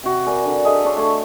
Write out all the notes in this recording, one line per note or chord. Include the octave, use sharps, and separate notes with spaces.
C3 F#4
A#4 D5 G#5
D3
G#4 A4 D#5 E5
D4 C#5 C6
A3 C#5